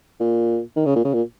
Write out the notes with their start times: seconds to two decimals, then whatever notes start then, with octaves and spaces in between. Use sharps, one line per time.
0.20 A#2
0.76 D#3
0.86 C#3
0.96 A#2
1.05 C#3
1.13 A#2